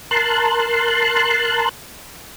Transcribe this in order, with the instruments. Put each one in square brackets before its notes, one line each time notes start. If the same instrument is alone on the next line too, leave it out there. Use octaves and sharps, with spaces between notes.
[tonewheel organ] A#4 A5 C6 F#6